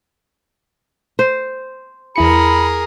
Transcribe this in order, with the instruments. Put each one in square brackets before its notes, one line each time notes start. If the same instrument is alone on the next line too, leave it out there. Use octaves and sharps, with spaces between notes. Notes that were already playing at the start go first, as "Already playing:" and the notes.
[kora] C5
[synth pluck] E2 E4 C#7 [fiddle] G#4 A#4 [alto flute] B5